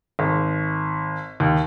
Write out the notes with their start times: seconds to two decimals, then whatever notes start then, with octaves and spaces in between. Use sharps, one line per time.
0.19 G#1
1.40 D#2